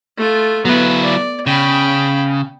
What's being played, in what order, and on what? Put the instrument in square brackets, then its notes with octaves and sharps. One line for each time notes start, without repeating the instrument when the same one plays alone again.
[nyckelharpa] A3 F4
[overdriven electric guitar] F#3 E4 [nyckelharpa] B3 B4
[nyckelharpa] D5
[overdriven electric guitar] C#3 [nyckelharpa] G5 B5